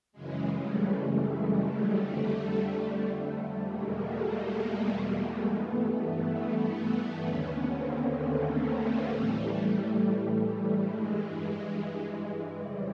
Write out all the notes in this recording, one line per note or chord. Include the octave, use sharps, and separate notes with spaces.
F#2 C#3 E3 G#3
G3 A3
G3 A3
F2 D3
E2 B2 G#3 A#3
G#3 A#3
G2 E3 A3 B3
D#2 D3 B3 C#4
A#3 C4
A3 B3
A2 E3 G3 A3
G2 E3 G#3
F2 C#3 E3 G3